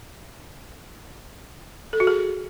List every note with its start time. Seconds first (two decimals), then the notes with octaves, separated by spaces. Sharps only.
1.93 A4
2.00 F#4
2.07 G#4